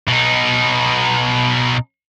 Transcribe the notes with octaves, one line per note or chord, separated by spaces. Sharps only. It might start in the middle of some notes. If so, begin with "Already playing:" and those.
B2 D#4